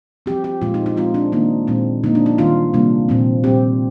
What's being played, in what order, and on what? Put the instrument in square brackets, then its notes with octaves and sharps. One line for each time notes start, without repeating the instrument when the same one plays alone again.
[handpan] C4 G4
F3
G4
A#2 F3 G#3 F4
D#4
D#4
F3 G#3 C4 F4
D4
D#3 A#3 D4 D#4
A#2 G#3 C4
D3 F3 A#3 D4 D#4
D4
D#4
D#3 G3 D4 F4
C3 G3 A#3 D4
A#2 F3 C4
A#2 G3 C4 G4